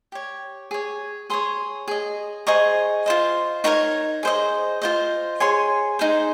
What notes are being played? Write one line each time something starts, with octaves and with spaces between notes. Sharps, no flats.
G4 C#5
G#4 C#5
G#4 C#5 C6 D#6
G#4 D#5
G#4 C5 D#5 A#5 C#6
F4 C5 D#5
D#4 A#4 C#5 A#5 C#6
G#4 C5 D#5
F4 C5 D#5
G#4 C#5 G#5 C6
D#4 G#4 C5